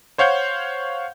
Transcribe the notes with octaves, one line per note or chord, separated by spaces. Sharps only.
C5 C#5 F5 F#5 G6